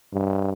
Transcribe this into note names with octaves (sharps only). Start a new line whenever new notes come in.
G2